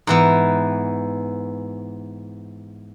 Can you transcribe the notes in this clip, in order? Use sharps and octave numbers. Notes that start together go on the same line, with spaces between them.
G#2 E3 B3